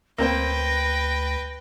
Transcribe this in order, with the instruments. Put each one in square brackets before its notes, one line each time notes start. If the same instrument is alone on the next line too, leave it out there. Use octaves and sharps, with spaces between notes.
[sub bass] D2 [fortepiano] A#3 C4 C5 [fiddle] B4 G5 [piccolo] A#6